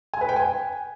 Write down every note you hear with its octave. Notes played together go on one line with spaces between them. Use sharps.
G#5
B4
G5
G#5